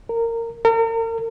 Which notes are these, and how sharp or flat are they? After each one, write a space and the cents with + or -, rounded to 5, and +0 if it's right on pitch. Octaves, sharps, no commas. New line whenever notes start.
A#4 -20
A#4 -40